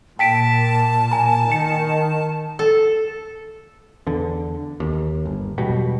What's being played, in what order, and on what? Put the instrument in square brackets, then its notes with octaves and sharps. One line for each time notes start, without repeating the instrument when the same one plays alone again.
[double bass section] A#2 [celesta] G5 B6 D7 [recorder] A5
[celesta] G#5 A#5
[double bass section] D#3 [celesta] C#7
[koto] A4
[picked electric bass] E2 D3
D#2
G1
E1 B1 B2 G3